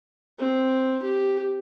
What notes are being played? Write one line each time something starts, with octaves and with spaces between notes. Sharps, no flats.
C4
G4